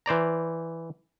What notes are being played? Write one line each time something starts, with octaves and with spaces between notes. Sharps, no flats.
E3 C5 D5 A#5